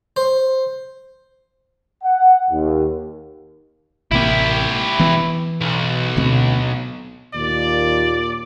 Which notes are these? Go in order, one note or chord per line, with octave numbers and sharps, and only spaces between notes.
C5
F#5
D#2
A1 C3 A#3 E4 G4
E3 B3
B1
D2 B2 C4
D#2 A#2 D5